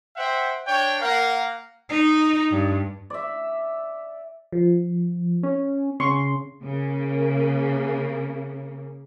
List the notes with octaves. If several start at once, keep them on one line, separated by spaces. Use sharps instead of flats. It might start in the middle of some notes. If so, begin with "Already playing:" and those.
C5 E5 F#5 G5
D4 C#5 G5
A#3 A#4 F5 F#5
D#4
G2
D5 E5
F3
C#4
C#3 C#4 C6 C#6
C#3 A#3